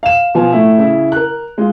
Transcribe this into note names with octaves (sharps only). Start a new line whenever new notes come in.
F5 E7
B2 F3 F4 G#5
A2 A3 E4
C#3 E4
A#4 F#6
G#3 F4